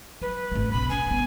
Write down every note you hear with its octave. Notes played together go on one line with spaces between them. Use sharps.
F#3 B4
G#1 A3
B1 C#3 B5
C#4 G#5
G2 B3